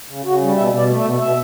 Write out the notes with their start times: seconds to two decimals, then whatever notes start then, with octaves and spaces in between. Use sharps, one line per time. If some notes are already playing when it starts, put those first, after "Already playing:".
0.09 C#3
0.25 C#3 F#4
0.41 G3
0.56 B2 E5
0.73 B2
0.78 D5
0.89 A3
0.99 E5
1.04 B2
1.20 B2 E5